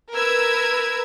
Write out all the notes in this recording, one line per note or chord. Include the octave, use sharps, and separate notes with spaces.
A#4 B4 E6 G#6